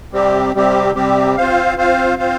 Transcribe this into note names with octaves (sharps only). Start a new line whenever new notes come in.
C3 G3 C4 G4
C3 G3 C4 G4
C3 G3 C4 G4
C4 F4 C5 F5
C4 F4 C5 F5
C4 F4 C5 F5